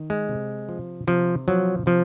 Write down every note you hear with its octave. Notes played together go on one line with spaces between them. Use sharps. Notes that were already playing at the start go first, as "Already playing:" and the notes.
Already playing: D#3
G#3
C3
F3
C3 F3
F3 F#3
C3 F3